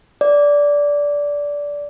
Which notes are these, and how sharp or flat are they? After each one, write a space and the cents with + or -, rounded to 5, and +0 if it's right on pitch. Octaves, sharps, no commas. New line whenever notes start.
D5 -15